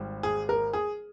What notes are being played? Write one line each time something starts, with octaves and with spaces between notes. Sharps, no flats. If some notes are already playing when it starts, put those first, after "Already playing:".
Already playing: G#1 G3
G#4
A#4
G#4